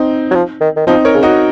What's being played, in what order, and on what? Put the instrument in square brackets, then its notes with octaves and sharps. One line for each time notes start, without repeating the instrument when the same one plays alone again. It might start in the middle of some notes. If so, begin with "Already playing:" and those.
Already playing: [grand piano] C4 D#4
[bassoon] F#3
F3
D#3
D#3
[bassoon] F3 [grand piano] C4 D#4
[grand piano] A#4 C#5
[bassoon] C#3
[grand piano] D#4 F#4